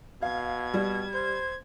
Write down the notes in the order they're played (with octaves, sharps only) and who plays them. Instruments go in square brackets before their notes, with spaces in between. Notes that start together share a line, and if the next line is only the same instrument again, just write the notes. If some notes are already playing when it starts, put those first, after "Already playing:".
[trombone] B2 [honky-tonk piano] F5 [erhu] G#6
[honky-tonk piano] G3
[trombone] C5 [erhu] G#6